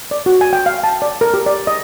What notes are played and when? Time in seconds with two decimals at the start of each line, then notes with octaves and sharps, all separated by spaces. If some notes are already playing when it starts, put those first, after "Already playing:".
0.11 D5
0.26 F#4
0.41 G#5
0.53 G5
0.66 F5
0.84 A5
1.02 D5
1.21 A#4
1.34 G4
1.46 D5
1.67 D#5